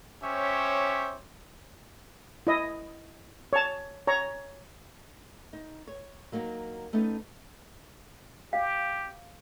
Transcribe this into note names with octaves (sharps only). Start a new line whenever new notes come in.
C#4 G4 C5 C#5 E5
E4 D#5
C#5 A5
C#5 A#5
D#4
C#5
F#3 A#3 D#4 F#4
A3 B3 C#4 D#4 A4
G4 F5